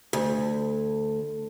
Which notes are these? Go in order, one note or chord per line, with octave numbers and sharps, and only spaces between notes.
D2